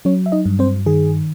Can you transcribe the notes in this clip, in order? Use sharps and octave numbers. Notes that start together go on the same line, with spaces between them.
F#3 C#4 C#5
E5
D#4 D#5
G2
C4 C5
D#3 G#4